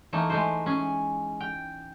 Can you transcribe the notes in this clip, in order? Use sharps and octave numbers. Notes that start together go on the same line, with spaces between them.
E3 A3 A#3 D#4
G#3 A3 C5
C#4 G#4
G5